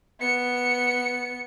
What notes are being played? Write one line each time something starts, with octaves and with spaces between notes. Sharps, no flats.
B3 C#7